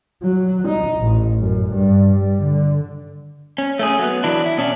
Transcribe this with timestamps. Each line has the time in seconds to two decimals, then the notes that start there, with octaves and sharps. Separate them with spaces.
0.23 F#3
0.68 D#4
1.00 A1
1.40 F#2
1.73 G2
2.13 G3
2.43 D3
3.58 C#4
3.79 A3 C#4 G#4
3.99 F#3 B3
4.24 E3 F#3 D4 E4
4.46 E4
4.58 B2 C#4 D4